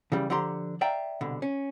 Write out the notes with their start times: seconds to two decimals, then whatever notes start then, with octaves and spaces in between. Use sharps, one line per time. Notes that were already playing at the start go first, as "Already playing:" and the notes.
0.12 C#3 E3 G3
0.30 D3 F3 G4 A#5 C6
0.81 D5 E5 F5 G5 A#5
1.21 C2 B2 D3
1.42 C#4